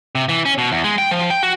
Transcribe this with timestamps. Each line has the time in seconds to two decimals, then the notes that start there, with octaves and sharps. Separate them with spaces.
0.15 C3
0.29 E3
0.46 C#4
0.58 B2
0.72 E2
0.84 G#3
0.98 G5
1.11 F3
1.30 G5
1.43 F#4